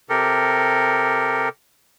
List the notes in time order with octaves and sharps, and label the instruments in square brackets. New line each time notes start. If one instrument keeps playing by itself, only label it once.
[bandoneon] C3 G4 A4 A#4